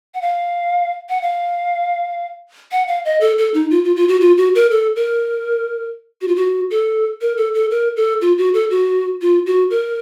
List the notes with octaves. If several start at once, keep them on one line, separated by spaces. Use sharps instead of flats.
F#5
F5
F#5
F5
F#5
F5
D#5
A4
A4
D#4
F4
F4
F4
F#4
F4
F#4
A#4
A4
A#4
F#4
F4
F#4
A4
A#4
A4
A4
A#4
A4
F4
F#4
A4
F#4
F4
F#4
A#4